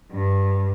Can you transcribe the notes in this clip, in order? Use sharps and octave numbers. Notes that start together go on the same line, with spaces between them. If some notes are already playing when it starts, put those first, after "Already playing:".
G2